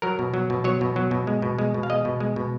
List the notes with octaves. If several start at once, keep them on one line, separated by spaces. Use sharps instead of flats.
F#3 A#4
B2
F#3
B2
F#3 C#5
B2
F#3
B2
G#3
B2
G#3
B2
F5
G#3 D#5
B2
G#3
B2